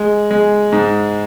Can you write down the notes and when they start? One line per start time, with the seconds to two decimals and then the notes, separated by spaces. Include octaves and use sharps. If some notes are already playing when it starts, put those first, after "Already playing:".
Already playing: G#3
0.31 G#3
0.72 G#2